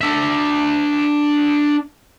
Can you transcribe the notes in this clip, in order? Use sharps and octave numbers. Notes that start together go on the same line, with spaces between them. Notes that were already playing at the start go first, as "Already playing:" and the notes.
D4 E5